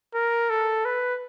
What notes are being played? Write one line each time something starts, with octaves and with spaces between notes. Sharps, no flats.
A#4
A4
B4